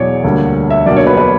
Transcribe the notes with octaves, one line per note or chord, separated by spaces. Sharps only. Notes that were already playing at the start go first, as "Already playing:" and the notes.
Already playing: E1 E2 F#3 C#5 D5
D2 D3 G3 A#3
E5
B1 B2 A#3 D4 D5
C#5
B4
B4